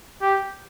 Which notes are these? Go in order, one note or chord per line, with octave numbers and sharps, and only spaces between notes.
G4